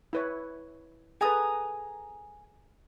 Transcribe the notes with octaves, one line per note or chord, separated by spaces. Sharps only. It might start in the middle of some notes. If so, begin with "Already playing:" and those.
E4 B4 C#5
G#4 A4 B4 G#5 A#5 D#6